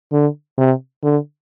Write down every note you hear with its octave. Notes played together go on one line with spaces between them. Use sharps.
D3
C3
D3